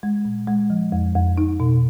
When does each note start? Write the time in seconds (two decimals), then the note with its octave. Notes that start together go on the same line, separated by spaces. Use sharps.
0.03 G#3
0.25 A#2
0.48 G#3
0.70 F3
0.92 F2
1.15 F2
1.38 D#4
1.60 B2